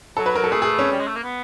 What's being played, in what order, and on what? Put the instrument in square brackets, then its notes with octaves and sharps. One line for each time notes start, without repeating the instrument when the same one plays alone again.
[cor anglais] F#3 [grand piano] A4
[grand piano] B4
A#4
A4
[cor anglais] A3 [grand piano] G#4
[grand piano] G#4
C#4
[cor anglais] G3
G#3
A3
A#3
B3